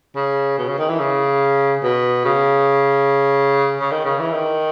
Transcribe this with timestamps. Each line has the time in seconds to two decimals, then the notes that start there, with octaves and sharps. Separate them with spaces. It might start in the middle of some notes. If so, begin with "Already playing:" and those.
0.16 C#3
0.58 B2
0.69 C#3
0.79 D#3
0.89 E3
1.00 C#3
1.83 B2
2.25 C#3
3.80 C#3
3.91 D#3
4.05 C#3
4.20 E3
4.33 D#3